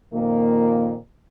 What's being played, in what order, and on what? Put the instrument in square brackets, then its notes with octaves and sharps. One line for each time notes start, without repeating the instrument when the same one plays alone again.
[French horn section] F2 A#2 D#3 A#3